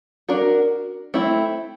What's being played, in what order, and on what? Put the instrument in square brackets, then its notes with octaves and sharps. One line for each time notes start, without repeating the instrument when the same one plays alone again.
[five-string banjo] D4 F#4 A#4
A3 C4 E4